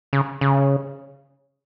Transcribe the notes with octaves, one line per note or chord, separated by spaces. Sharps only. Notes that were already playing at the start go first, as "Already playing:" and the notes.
C#3
C#3